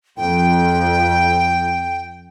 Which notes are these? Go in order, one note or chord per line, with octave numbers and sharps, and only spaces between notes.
F2 G5